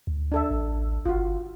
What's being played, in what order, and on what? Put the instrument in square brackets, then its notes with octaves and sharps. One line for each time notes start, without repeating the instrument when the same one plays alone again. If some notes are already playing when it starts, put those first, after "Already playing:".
[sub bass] D2
[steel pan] D4 A4 E5
[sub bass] A1
[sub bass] G1 [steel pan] F4 F#4